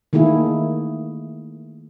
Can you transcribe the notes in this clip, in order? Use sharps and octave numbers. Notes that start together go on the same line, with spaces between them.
D#3 A3 A#3 E4 G#4